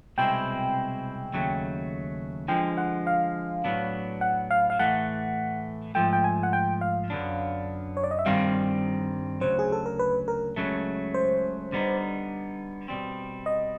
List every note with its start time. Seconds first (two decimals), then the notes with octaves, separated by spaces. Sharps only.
0.18 C2 B2 G#3 C4 E4 G5
1.33 D#2 C#3 F#3 A3
2.48 D3 F3 G#3 G5
2.77 F#5
3.07 F5
3.64 A2 F#3 B3 D4
4.21 F#5
4.51 F5
4.70 F5
4.79 A2 E3 A3 F#5
5.95 G#2 F3 A3 G5
6.13 G5
6.24 G#5
6.43 F#5
6.53 G5
6.81 F5
7.10 F#2 D3 F#3 B3 D4
7.97 C#5
8.04 D5
8.11 D#5
8.19 E5
8.26 G2 D#3 G3 C4 F5
9.41 D2 C#3 F#3 C5
9.59 G#4
9.72 A4
9.86 A#4
9.99 B4
10.28 A#4
10.56 C#2 C#3 F#3 A3
11.14 C5
11.72 D3 G3 B3 D#4
12.88 B2 G3 C4
13.46 D#5